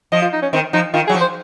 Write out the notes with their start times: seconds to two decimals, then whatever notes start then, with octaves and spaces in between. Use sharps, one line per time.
0.12 F3 D#5
0.22 F4
0.33 D#4
0.42 C#4
0.53 D#3 C4
0.73 F3 D#4
0.94 D#3 F4
1.07 F#3 G#4
1.14 F3
1.21 C5